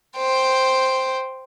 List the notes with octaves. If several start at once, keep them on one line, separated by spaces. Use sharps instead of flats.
C5 G5